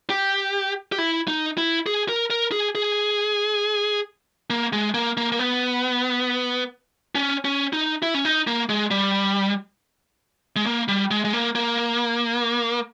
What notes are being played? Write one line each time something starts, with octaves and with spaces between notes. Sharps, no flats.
G4
G4
E4
D#4
E4
G#4
A#4
A#4
G#4
G#4
A#3
G#3
A#3
A#3
A#3
B3
C#4
C#4
D#4
E4
C#4
D#4
A#3
G#3
G3
G#3
A#3
G3
G#3
G#3
A#3
A#3